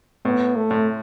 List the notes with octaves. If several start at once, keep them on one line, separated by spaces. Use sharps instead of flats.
A2 B3
A3
A2